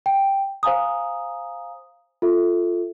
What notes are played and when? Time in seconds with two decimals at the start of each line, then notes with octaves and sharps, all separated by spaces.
0.06 G5
0.63 C5 F5 G#5 A#5 D#6
2.22 F4 A4 E5